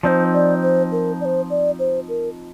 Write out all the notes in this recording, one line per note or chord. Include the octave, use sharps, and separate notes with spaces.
F3 C4 D#4 C5 D5
D5
C5
A#4
D5
C5
D5
C5
A#4